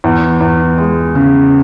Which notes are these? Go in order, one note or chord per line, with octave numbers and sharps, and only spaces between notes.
E2
E2
G#3
C#3